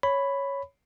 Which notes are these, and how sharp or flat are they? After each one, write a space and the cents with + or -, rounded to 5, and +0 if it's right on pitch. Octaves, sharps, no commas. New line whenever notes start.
C#5 +0 B5 +5